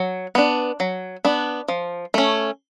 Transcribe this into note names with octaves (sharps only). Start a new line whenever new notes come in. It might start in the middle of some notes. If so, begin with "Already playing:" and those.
Already playing: F#3
B3 D4
F#3
B3 D4
F3
A3 C#4